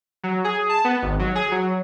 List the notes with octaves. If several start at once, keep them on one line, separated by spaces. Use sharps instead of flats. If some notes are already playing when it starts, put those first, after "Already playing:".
F#3
G#4
A5
B3
G#1
F#3
G#4
F#3